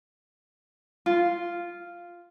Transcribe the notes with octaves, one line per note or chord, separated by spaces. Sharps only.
F4